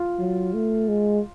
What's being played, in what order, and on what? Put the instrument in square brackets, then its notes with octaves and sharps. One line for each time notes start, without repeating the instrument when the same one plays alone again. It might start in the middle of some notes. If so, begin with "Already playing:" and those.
Already playing: [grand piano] F4
[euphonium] F#3
A3
G#3